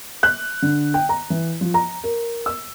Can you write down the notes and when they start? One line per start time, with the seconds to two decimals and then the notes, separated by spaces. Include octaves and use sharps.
0.23 F#6
0.62 D3
0.94 G5
1.09 A#5
1.30 E3
1.61 F3
1.74 A#5
2.04 A#4
2.46 E6